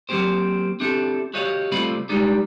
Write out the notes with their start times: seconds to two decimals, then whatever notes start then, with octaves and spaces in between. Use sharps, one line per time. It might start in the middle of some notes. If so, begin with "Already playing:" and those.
0.09 F#3 A#3 C4 G4 C5
0.80 C4 D4 E4 G4 A4
1.34 F#4 G4 C#5 D#5 F5
1.72 C3 G3 A3 C4 F4 B5
2.09 G3 G#3 D4 D#4 G4